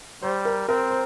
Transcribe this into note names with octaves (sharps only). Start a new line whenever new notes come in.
G3 C5
A#4
C4 A#4
C5